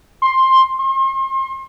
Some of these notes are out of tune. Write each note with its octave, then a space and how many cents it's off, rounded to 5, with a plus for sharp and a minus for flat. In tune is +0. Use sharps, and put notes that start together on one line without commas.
C6 +10
C6 +40